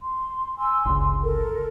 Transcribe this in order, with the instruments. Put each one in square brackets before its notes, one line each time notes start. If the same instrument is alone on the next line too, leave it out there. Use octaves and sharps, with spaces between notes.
[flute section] C6
G#5 C6 E6
[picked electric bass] G1 C#2 [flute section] C6
[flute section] A4 A#4